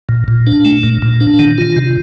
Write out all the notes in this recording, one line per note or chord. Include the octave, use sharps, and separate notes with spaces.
A#2
A#2
D4
A3
A#2
A#2
D4
D#3
F4
C3